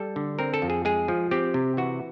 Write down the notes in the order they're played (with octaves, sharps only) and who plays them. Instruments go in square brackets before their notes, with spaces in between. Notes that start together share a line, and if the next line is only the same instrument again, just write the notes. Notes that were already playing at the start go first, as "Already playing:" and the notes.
Already playing: [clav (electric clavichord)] G3 A4
D3
C4 A#4
A4
F2
G#4
G#3 G#4
F3
C4 G4
C3
E3 F#4